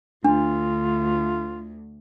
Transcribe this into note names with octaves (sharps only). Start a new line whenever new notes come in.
D2 D4 F4